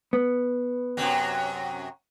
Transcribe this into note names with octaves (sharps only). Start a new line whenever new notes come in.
B3
F#2 C3 F#3